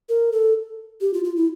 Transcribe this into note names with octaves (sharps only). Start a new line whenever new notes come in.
A#4
A4
G4
F4
F4
E4